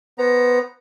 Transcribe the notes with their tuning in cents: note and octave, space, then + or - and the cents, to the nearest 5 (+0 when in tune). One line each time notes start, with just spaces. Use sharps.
B3 +0 C5 -5 A#5 +15